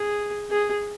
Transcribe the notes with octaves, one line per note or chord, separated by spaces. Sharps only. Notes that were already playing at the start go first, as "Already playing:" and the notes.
Already playing: G#4
G#4